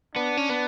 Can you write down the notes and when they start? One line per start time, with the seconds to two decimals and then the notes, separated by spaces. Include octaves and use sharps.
0.16 B3 D4
0.37 C#4
0.49 B3